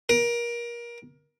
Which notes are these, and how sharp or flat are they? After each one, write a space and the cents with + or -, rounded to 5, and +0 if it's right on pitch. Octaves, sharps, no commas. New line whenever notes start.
A#4 +25